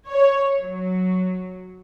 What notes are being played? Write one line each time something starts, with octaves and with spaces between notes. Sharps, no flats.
C#5
F#3